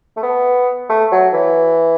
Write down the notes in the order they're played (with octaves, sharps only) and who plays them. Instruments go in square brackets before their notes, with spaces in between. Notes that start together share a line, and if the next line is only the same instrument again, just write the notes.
[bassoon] A3
B3
A3
F#3
E3